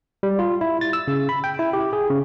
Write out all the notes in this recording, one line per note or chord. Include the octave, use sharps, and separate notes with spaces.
G3
F4
E4
A6
E6
C#3
B5
G5
E4
G4
G#4
C#3